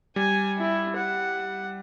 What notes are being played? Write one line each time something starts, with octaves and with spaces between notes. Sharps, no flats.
G3 G#5
E4
F#5